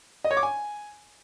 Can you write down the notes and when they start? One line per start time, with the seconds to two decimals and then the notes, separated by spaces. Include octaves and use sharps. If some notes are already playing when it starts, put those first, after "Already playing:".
0.24 D#5
0.31 C#5
0.37 D6
0.43 G#5